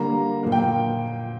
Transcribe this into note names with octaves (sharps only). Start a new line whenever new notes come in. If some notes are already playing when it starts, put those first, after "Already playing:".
Already playing: D3 G3 A#3 A#5
A#2 F3 A#3
G5